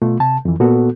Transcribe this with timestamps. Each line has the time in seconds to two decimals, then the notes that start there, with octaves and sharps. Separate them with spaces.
0.02 B2 A3 F4
0.20 C3 A5
0.45 F2 E3
0.60 A#2 B3 F#4 A4